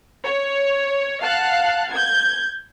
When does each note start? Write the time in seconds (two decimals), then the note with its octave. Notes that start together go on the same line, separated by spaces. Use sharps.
0.24 C#5
1.23 F5 F#5 A5 F#6
1.92 G6 G#6